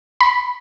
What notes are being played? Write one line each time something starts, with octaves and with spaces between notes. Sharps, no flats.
B5